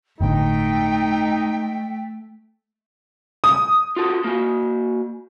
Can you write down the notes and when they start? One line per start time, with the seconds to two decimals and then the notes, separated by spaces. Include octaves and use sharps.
0.21 G1 A2 D3 A3 D#4 G5
3.44 D#6
3.96 F4 F#4 A4
4.24 A#3 F#4